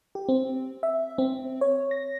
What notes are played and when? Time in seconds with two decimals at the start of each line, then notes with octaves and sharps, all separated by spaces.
0.15 G4
0.29 C4
0.83 E5
1.18 C4
1.61 C#5
1.91 A#6